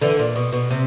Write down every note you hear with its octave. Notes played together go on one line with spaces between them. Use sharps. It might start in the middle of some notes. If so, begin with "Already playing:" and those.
D3 E3
A#2
B2
B2
C3